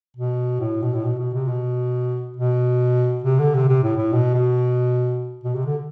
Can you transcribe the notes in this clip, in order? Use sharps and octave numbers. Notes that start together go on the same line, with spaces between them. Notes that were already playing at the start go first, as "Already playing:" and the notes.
B2
A2
B2
A2
B2
B2
C3
B2
B2
C3
D3
C3
C3
A2
A2
B2
B2
B2
C3
D3